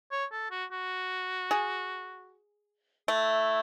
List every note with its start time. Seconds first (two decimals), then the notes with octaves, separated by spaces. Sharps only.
0.11 C#5
0.32 A4
0.51 F#4
0.71 F#4
1.51 G#4
3.08 A3 E4